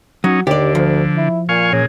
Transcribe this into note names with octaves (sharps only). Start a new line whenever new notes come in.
F#3 C#4 D#4
D#2 D3 G4 D5
D2 F3
E4
A#2 F5 G#5 C#6
A#2 C#4 G#4